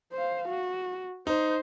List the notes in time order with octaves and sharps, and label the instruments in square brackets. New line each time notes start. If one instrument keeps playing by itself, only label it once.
[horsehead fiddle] C5 F5
F#4
[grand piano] D#4 [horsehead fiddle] C5